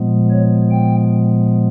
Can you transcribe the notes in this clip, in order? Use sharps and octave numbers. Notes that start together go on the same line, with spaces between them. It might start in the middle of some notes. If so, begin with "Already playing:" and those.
Already playing: A#2 F3 G#3 B3
C#5
G5